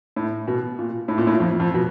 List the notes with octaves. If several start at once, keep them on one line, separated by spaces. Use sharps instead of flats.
A2
B2
A#2
A2
A#2
A2
F2
F2
B2